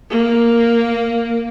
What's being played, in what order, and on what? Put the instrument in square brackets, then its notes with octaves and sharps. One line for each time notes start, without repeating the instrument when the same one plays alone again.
[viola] A#3